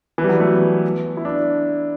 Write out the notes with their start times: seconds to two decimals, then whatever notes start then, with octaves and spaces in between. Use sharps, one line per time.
0.18 E3
0.24 G3
0.29 F#3
0.40 A3
0.51 B3
1.17 E4
1.25 D4